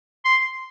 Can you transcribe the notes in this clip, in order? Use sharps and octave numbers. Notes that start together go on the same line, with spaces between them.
C6